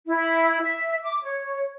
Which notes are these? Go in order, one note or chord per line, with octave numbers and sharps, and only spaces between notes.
E4
E5
D6
C#5